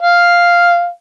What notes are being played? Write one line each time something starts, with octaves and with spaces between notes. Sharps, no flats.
F5